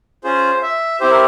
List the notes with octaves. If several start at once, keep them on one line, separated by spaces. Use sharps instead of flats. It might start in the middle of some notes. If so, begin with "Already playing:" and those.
C#4 F4 G#4 C5
E5
C4 E4 G4 C5
A#4